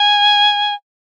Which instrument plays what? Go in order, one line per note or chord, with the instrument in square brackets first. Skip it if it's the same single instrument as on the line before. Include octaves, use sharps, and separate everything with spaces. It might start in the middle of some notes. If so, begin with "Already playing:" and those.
Already playing: [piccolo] G#5